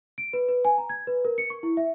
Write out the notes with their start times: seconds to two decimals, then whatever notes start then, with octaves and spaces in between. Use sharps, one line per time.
0.18 D7
0.33 B4
0.49 B4
0.65 G#5
0.78 A#5
0.89 G#6
1.07 B4
1.25 A#4
1.38 C#7
1.50 C#6
1.63 E4
1.77 E5